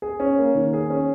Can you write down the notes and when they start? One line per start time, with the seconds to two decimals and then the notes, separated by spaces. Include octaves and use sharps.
0.02 G#4
0.20 C#4
0.38 A#3
0.55 D#3
0.73 G#4
0.90 C#4